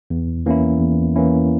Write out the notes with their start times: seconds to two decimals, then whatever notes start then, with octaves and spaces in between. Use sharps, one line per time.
0.10 E2
0.46 E3 A#3 C#4 E4
0.80 E2
1.16 E3 A#3 C#4 E4